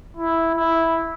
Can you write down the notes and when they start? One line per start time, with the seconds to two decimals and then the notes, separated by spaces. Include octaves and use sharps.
0.17 E4
0.54 E4